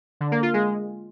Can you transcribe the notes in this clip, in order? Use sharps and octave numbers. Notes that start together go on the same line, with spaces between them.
D3
A#3
F4
G#3